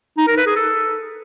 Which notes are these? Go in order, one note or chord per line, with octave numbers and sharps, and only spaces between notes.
D#4
A#4
B4
G#4
A4